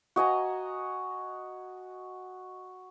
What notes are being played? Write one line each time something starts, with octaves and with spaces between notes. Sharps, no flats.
F#4 D#5 G#5 A#5